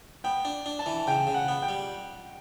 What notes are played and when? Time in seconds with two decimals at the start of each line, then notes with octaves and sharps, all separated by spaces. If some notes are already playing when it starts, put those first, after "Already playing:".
0.24 B3 G5
0.45 D4
0.66 D4
0.79 A5
0.86 E3
1.07 C#3 G5
1.27 C#3
1.34 F#5
1.48 B3
1.62 G5
1.69 G3